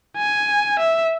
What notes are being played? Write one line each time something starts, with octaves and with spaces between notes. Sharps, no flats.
G#5
E5